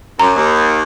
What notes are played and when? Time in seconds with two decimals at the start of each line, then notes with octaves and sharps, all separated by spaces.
0.19 F#2 A#5
0.35 D#2